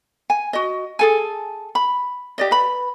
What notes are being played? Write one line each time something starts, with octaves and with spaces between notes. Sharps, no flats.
G#5
F#4 D#5
G#4 A4 G#5
B5
G4 D5 D#5
B4 B5